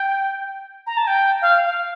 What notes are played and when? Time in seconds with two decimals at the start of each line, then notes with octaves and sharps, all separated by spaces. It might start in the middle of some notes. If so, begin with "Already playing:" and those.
Already playing: G5
0.87 A#5
0.97 A5
1.07 G5
1.42 F5
1.65 F5